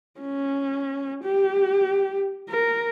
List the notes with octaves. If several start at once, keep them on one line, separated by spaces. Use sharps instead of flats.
C#4
G4
A#4